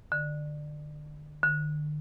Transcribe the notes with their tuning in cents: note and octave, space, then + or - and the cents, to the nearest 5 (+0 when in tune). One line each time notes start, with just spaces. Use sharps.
D3 +25
D3 +45